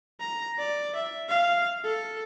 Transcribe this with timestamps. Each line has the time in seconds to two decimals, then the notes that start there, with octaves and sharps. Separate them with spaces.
0.20 A#5
0.59 D5
0.95 E5
1.29 F5
1.84 A4